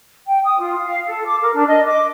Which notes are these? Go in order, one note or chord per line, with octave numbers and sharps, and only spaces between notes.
G5
D#6
F4
F5
A4
D6
A#4
D4
D#5
D6